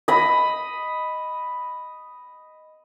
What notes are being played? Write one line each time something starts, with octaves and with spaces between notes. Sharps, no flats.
D#5 B5